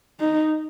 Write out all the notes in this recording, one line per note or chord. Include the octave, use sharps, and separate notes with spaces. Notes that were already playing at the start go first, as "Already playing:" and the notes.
D#4